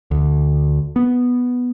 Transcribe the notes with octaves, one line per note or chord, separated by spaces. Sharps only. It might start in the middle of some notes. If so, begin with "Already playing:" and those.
D2
B3